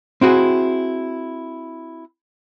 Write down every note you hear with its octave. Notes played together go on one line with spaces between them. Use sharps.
C4 E4 F#4 G#4